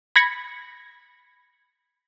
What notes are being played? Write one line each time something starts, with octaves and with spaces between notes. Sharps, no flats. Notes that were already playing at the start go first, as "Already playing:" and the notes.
B5 G#6 A#6 C#7